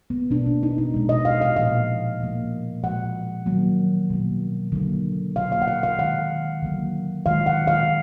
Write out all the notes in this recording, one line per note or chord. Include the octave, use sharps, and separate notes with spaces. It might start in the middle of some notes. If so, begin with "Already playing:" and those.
B3
B2 A#3 D4
B3
D#4
D#4
B2 G#3
D#5
F5
F5
A#2 F3 A#3 F5
A#2 F3 A#3
A#2 F3 G#3 F#5
D#3 F#3 A#3
B2 A#3
D3 F#3 A#3
B2 A#3 F5
F5
F#5
F5
F5
D#3 G#3 F#5
D3 F#3 A#3
D#3 G#3 F5
F#5
F5